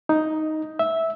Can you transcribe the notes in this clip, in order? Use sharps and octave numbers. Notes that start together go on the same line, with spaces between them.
D#4
E5